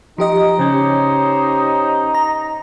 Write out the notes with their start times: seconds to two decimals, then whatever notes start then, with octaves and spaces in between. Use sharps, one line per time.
0.18 F3 D#4 G4 D#5
0.59 C#3 C#4 G4 C5 C#5
2.14 A#5